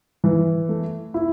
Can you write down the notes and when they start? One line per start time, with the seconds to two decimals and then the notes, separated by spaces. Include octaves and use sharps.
0.24 E3
0.69 A3
1.14 E4